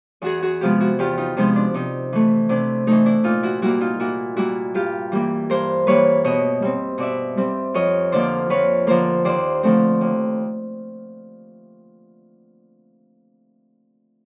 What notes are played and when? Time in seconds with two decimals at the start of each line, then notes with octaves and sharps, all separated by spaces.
0.22 E2 F#4 G#4
0.42 F#4 G#4
0.61 C3 F3 G#3 B3 F4 G4
0.80 E4 F#4
0.99 E2 F4 G4
1.17 D#4 F4
1.37 C3 F3 G#3 B3 D#4
1.56 D4
1.74 C3 D#4
2.13 E3 A3
2.49 C3 D4 E4
2.87 E3 A3 D#4
3.05 D4 E4
3.24 A#2 D#4 F4
3.43 E4 F#4
3.62 G3 A#3 E4 F#4
3.81 D#4 F4
4.00 A#2 E4 F#4
4.37 G3 A#3 E4 F#4
4.74 G2 F4 G4
5.12 E3 G3 A#3
5.50 G2 A#4 C5
5.87 E3 G3 A#3 B4 C#5
6.24 B2 C#5 D#5
6.62 G3 C4
6.98 B2 D5 E5
7.37 G3 C4
7.74 F2 C#5 D#5
8.12 D3 F3 A#3 C5 D5
8.50 F2 B4 C#5
8.87 D3 F3 A#3 A#4 C5
9.25 D#2 C5 D5
9.63 D3 F3 A3 C4
10.01 D#2